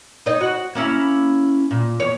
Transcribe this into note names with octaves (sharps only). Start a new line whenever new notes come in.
D#4 C#5 D#5
F#4
A#3 C#4 E4
A#2
E2 C#5